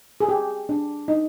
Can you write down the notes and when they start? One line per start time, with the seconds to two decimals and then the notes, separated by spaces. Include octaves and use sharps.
0.21 G#4
0.29 G4
0.69 D4
1.08 D#4